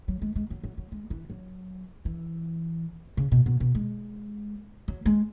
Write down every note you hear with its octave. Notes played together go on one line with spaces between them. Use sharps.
F#3
G#3
G#3
F#3
F#3
F#3
G#3
E3
F#3
E3
C#3
B2
B2
B2
G#3
F#3
G#3